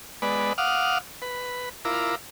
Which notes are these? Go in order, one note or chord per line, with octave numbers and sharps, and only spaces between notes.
G#3 B3 B4 D5
F5 F#5 D6 D#6 F6
B4
E4 F4 A#4 D6